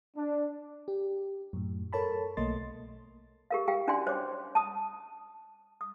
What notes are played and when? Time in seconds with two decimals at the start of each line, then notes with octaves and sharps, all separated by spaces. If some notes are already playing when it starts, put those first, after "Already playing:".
0.16 D4
0.88 G4
1.53 F#2 A2
1.93 A4 A#4 C#5 A5 B5
2.37 B1 A3 A#3 D#5 C6 A6
3.51 G4 A#4 F5
3.68 G4 F5 G5
3.88 C#4 D4 F#4 D5 G5 C6
4.07 C5 C#5 D6
4.55 A5 D#6
5.81 D#6